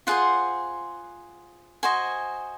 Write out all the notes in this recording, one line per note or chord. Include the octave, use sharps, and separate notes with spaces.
F4 G#4 C5 F#5
F#4 C5 D#5 G#5